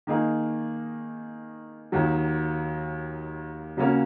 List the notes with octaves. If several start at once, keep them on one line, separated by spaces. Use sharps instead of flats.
D#3 A#3 D#4 G#4
D#2 D#3 F#3
C#3 F#3 A#3 C#4 F#4